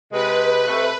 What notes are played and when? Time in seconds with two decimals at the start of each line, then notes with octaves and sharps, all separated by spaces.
0.12 C3 G#3 B4
0.68 C3 A3